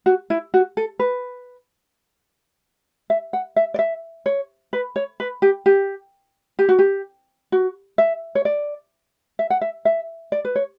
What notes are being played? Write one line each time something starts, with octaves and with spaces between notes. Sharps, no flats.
F#4
E4
F#4
A4
B4
E5
F#5
E5
D5
E5
C#5
B4
C#5
B4
G4
G4
G4
F#4
G4
F#4
E5
C#5
D5
E5
F#5
E5
E5
D5
B4
C#5